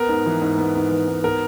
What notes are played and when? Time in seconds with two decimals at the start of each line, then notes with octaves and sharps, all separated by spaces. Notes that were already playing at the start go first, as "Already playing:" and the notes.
Already playing: B3 A#4
0.09 G#2
0.26 E3
0.42 G#2
0.58 B3
0.75 G#2
0.91 E3
1.08 G#2
1.24 B3 A#4